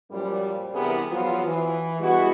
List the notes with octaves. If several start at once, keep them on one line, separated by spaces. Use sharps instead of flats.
F#2 A#2 F3 G3
G2 C3 E3 B3 G#4 A#4
E2 F3 F#3 B3 F4
E3
G3 G#3 B3 E4 F#4